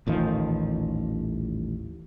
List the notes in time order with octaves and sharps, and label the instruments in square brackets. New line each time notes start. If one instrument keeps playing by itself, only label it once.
[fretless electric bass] D#1 A1 D#3 F3